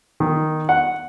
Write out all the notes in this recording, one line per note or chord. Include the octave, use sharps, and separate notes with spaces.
D#3
F#5